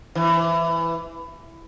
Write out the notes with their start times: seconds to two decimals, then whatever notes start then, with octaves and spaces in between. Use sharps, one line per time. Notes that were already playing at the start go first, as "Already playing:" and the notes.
0.15 E3